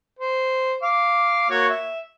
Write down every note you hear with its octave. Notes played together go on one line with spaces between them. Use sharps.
C5
F5 D6
A#3 F#4 C#5
E5